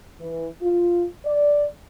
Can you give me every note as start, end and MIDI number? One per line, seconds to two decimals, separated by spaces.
0.21 0.47 52
0.62 1.05 65
1.25 1.65 74